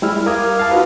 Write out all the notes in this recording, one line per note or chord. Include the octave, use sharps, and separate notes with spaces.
G3 G#3 E4 E5 F6
A#4 F5 D6 D#6 F6 G#6
F5 A5
D#4 F4 F#4 B4